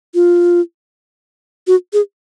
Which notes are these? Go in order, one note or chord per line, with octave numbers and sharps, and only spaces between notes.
F4
F#4
G#4